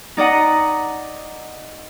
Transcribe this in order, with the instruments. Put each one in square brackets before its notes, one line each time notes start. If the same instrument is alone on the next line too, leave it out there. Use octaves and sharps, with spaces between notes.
[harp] D#4 D5 D#5 F#5 A#5